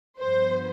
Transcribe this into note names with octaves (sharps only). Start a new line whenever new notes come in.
G2 F3 B3 C5